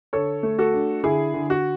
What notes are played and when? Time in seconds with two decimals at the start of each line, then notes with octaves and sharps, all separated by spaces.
0.13 D3 A4 C#5
0.43 A3
0.58 F#4 A4
0.74 D4
1.04 D3 E4 G#4
1.34 D3
1.50 F#4